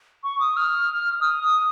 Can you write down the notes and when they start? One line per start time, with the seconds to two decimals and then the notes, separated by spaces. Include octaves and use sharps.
0.24 C#6
0.40 D#6
0.57 F6
1.21 D#6